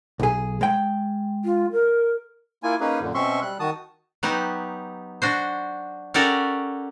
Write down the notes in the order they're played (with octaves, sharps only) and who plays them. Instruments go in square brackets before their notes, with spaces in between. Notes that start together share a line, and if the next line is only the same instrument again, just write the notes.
[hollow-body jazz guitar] B1 G#4
G#3 G5
[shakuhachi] F4
A#4
[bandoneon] A#3 E4 F4 G#5
A#3 C#4 D#4 G#4 B4
F#2 A#2 D3
B2 C4 C#4 E5 C6 C#6
G3 F#6
D#3 F#4 A5 D#6
[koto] F#3 B3 D#4 G4
D4 F#4 C5
C#4 F#4 G4 A4 A#4 D5